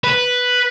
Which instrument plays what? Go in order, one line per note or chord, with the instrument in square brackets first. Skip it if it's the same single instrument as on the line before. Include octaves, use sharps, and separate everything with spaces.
[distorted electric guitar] B4